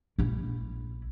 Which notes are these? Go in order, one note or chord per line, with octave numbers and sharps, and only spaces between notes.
A#1 E4